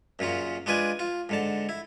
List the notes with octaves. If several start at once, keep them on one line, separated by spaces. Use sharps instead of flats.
F#2 A#2 C#3 F4
G#3 D4 F4 B4 D5 G#5
F4
G#2 D3 A5
E4